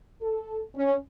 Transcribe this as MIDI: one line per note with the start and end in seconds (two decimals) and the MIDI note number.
0.22 0.60 69
0.75 0.95 61